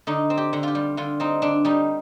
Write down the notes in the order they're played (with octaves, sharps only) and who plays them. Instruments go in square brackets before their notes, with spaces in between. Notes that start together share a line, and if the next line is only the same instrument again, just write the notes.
[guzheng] D3 D#4
C4
G4
D3
F4 G4
G3
D3 F4
C4 D#4
D3 D4
G3 D#4